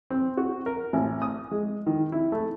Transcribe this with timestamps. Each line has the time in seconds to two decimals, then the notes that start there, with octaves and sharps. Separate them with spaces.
0.10 C4
0.37 F#4
0.66 A#4
0.93 A1
1.22 D#6
1.51 G#3
1.87 D#3
2.12 E4
2.32 A3